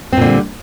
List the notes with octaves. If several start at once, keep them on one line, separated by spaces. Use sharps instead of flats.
A#2 D3 G3 C4